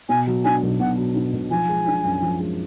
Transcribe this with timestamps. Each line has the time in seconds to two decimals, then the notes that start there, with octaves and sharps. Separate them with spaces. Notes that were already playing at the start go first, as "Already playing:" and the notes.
0.09 B2 G#5
0.27 F#3
0.44 D4 G#5
0.63 B1
0.80 B2 F#5
0.98 F#3
1.15 D4
1.33 B1
1.50 F3 G#5
1.69 G#3
1.86 D4
2.05 F#2
2.22 F3
2.40 G#3